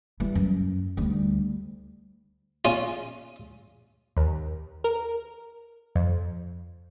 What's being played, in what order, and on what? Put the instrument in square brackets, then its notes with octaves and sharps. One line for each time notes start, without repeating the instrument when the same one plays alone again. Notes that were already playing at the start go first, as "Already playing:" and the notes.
[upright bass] E3 G3
F#2
D2 G3
[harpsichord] C#4 F4
[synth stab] D#2
A#4
F2